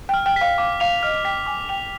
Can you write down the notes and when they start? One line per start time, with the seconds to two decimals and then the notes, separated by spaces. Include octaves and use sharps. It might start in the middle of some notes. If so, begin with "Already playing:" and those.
0.09 G5 F6
0.26 G5
0.36 F5 B6
0.58 F5 D6
0.80 F5 F7
1.03 D#5 F6
1.25 G5 B6
1.46 G#5 D6
1.69 G5 F7